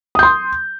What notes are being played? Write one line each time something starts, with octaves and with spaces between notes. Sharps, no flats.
C6 D#6 G6